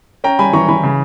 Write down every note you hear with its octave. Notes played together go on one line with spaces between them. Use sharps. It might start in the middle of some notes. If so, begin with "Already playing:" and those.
C#4 G5 A#5
G3 G#5 B5
E3 A#5 C#6
E3 G#5 B5
C#3